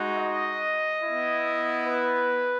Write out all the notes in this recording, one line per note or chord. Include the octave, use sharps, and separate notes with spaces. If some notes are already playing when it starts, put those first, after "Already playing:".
Already playing: G#3 D#4 F#4
D#5
B3 E4
B4